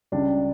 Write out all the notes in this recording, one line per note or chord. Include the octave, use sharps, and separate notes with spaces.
C#2 C#3 G3 D4